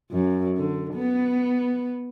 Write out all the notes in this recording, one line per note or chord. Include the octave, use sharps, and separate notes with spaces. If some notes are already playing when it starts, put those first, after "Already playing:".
F#2
D3
B3